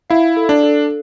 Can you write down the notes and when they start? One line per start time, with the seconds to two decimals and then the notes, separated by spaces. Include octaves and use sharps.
0.10 E4 F5
0.37 A4
0.49 D4
0.63 A4